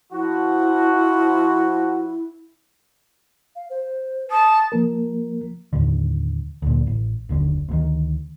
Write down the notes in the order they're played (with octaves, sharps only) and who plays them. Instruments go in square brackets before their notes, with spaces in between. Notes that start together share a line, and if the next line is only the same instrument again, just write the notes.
[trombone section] F3 F#4 [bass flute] E4
[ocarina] F5
C5
[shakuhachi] A5 [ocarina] D#6
[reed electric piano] F3 A#3 A#4
[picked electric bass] D#2 A2 D3
D2 A#2
A1
F#1 D#2 D3
D2 A#2 D#3